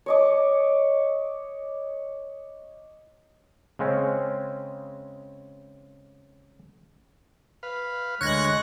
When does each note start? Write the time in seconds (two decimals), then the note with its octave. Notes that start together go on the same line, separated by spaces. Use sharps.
0.06 C#5 D#5 D6
3.79 C#3 G#3 C4 C#4
7.63 B4 F5
8.21 D2 G#3 C#5 C#6 F#6 G#6 A#6